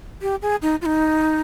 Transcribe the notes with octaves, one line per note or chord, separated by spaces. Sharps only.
G4
G#4
D#4
F4
D#4